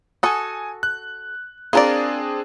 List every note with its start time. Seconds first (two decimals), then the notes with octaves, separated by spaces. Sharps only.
0.23 F#4 A4 G#5 D#6
0.83 F#6
1.73 C4 D4 F4 G#4 A#4 D5